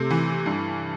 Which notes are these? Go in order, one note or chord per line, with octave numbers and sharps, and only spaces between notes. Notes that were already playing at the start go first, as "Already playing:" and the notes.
Already playing: C3 A3
E3
G2